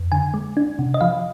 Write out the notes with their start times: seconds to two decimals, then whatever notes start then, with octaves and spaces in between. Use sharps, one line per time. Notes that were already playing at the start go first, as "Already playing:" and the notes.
Already playing: F2
0.12 D3 G#5
0.34 G#3
0.57 D4
0.79 C3
0.94 D#5
1.01 F3 F5